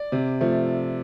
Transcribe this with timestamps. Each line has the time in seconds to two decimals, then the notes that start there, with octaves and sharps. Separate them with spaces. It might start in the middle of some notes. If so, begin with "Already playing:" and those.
Already playing: D5
0.12 C3
0.41 F3 A3